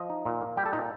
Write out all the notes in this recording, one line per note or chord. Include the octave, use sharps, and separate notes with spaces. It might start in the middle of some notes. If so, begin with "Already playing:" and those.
Already playing: F3 D#5
D#4
A#2
A#3
G3 G4 G5
A4 A5
A#2 D#4 D#5